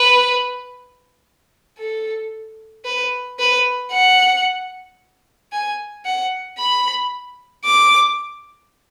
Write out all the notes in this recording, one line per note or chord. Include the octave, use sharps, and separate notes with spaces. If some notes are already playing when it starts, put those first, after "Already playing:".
Already playing: B4
A4
B4
B4
F#5
G#5
F#5
B5
D6